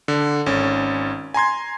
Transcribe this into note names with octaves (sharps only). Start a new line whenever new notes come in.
D3
G#1 C#4
G#5 A#5 C6 G#6